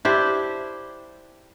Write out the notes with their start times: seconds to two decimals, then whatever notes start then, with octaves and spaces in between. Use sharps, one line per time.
0.05 D4 E4 G4 C5